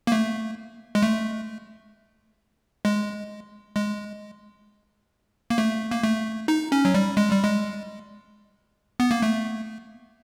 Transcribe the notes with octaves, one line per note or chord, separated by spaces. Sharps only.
A#3
A3
G#3
A3
G#3
G#3
A#3
A3
A#3
A3
D#4
C#4
F#3
G3
G#3
G3
G#3
B3
A#3
A3